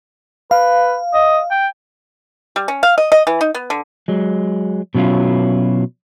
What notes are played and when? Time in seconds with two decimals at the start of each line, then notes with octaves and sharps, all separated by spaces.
0.51 B4 F5
1.14 D#5
1.51 G5
2.56 G3
2.68 C#4
2.83 F5
2.98 D#5
3.12 D#5
3.27 E3
3.41 D#4
3.54 B3
3.70 D3
4.08 F#3 G#3
4.95 B2 F#3 C#4 E4 F4